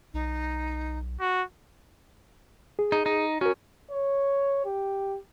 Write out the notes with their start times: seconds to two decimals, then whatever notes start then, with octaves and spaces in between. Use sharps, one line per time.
0.14 B1 D#4
1.21 F#4
2.79 G#4
2.92 D#4
3.06 D#4
3.41 C#4 F#4 A#4
3.92 C#5
4.66 G4